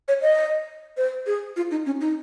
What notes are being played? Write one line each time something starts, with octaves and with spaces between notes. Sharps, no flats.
C#5
D#5
C5
G#4
F4
D#4
C#4
D#4